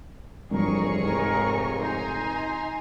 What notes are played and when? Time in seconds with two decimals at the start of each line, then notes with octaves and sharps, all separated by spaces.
0.51 F1 G2 E3 F3 G#4 A#4 C#5 C#6
1.05 G#2 A#4
1.79 D#4 G#5 A#5 C6